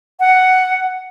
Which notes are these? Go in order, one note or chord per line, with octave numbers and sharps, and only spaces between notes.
F#5